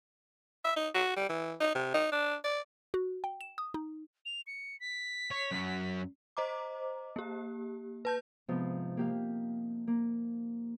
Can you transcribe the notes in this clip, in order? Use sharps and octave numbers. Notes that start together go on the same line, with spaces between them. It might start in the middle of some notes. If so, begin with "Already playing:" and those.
E5
D#4
F#4
G3
E3
D#4
C3
D#4
D4
D5
F#4
G5
E7
D#6
D#4
F7
C#7
B6
C#5
F#2 F#3
C5 D#5 A#5 D6
A#3 G4
B4 A5 G6
G#2 C3 F3 B3 D#4
A#3 G4 F5
A#3